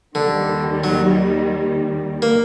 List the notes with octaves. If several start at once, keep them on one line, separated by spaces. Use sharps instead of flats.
D#2 D3 D#3 G3
F#3
A#3